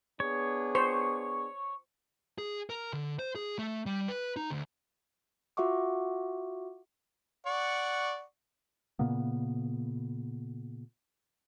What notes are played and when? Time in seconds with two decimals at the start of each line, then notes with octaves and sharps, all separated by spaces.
0.20 B3 D4 G#4 C#5
0.75 C5 C#6
2.38 G#4
2.70 A#4
2.93 D3
3.19 C5
3.35 G#4
3.59 A3
3.86 G3
4.08 B4
4.37 D#4
4.51 D2
5.57 F4 F#4 E5 F#5 C#6 D6
7.46 D5 F#5 C#6
8.99 A#2 C#3 A#3 B3